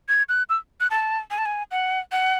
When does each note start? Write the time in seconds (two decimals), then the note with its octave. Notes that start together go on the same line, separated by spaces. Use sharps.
0.09 G#6
0.29 F#6
0.49 E6
0.80 F#6
0.90 A5
1.31 G#5
1.38 A5
1.45 G#5
1.71 F#5
2.12 F#5